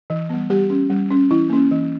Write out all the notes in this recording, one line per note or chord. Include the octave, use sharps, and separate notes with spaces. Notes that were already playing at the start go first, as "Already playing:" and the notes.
E3
G3 B3
G3 G4
C#4
G3
C#4
E3 E4
A#3 C#4
E3